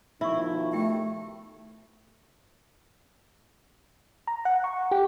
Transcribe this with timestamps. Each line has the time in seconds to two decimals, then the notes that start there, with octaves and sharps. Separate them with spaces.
0.21 B2 D#3 F3 E4 E5 C#6
0.73 A3 G4 E5 G5
4.27 A#5
4.45 F#5
4.64 C#6
4.91 G4